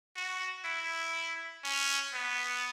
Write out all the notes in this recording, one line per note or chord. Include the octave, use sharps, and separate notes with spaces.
F#4
E4
C#4
B3